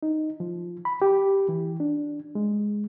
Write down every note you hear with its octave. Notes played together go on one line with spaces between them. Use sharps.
D#4
F3
B5
G4
E3
D4
G#3